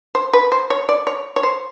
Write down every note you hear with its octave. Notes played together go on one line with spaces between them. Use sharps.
C5
B4
C5
C#5
D5
C#5
C#5
C5